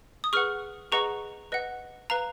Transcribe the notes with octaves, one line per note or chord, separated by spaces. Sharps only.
D#6
G#4 B4 F#5 C#6 F6
G#4 B4 D#5 F#5 A#5 C#6
B4 D#5 F#5
B4 F5 A#5